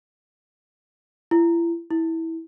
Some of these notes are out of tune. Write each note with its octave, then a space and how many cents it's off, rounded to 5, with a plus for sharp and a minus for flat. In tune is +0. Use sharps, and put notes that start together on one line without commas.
E4 +35
E4 -15